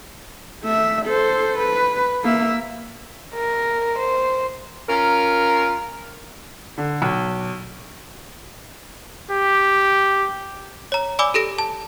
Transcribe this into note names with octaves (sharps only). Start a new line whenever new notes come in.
A3 E5
A4 C5
B4
A#3 E5
A#4
C5
C#4 F4 A#4
D3
B1
G4
C#5 A#5
D5 G#5 B5 D6 E6 G7
G4 A4 A#6 D7
A5